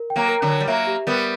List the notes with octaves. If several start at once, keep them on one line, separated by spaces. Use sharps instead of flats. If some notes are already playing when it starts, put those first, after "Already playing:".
Already playing: A#4
G5
F#3 A#3
A#4
D3 F#3
C#5
G3
F#3 A#3 E5
G4
G3 B3 A#4